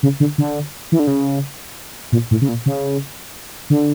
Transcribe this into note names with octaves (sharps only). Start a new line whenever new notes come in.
C#3
D3
D3
E3
D3
C#3
A#2
A2
C#3
A#2
C#3
D3